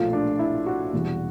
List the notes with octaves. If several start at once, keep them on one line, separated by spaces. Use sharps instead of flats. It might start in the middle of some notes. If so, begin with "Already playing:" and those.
Already playing: B1 A#2 F3 A3 F4
D4
E4
F#4
E1 E2 C3 E3 G3